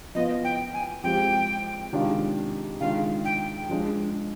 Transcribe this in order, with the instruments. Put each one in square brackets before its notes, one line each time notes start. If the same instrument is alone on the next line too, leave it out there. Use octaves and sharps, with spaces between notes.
[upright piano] F3 B3 F4 [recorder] D#5
[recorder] G5
G#5
[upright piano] F3 G#3 C4 G4 [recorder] G5
[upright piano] C3 D#3 G#3 D4 F4
[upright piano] D#3 G#3 D4 F4 [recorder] F5
[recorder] G5
[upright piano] F3 G#3 D4